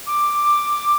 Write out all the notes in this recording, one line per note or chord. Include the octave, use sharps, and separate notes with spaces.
D6